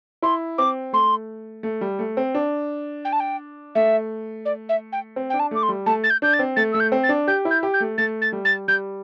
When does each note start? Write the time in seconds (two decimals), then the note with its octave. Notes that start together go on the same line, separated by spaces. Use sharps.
0.22 E4 C6
0.58 C4 D6
0.93 A3 C6
1.63 A3
1.81 G3
1.99 A3
2.17 C4
2.35 D4
3.05 G5
3.13 A5
3.20 G5
3.75 A3 E5
4.45 D5
4.69 E5
4.93 G5
5.16 C4
5.30 D4 G5
5.40 A5
5.51 A3 D6
5.63 C6
5.69 G3
5.86 A3 A5
6.04 A6
6.10 G6
6.22 D4 G6
6.33 A6
6.39 C4
6.56 A3 A6
6.72 A3 E6
6.80 G6
6.92 C4
7.04 A6
7.09 D4
7.28 G4 G6
7.45 E4
7.51 G6
7.63 G4
7.74 G6
7.80 A3
7.98 A3 A6
8.22 A6
8.32 G3
8.45 A6
8.68 G3 G6